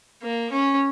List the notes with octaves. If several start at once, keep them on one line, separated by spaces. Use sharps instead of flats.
A#3
C#4